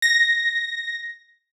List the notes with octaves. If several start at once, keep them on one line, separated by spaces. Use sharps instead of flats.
A#6